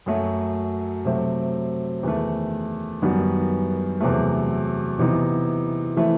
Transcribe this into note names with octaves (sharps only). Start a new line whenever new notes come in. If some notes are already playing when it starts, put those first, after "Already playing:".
F#2 F#3 A3
C3 F#3 A3 C4
E2 D#3 A3
F#2 D#3 G3 B3 F#4
E2 C3 F#3 A3
C3 E3 B3 D#4
E3 A3 C4 E4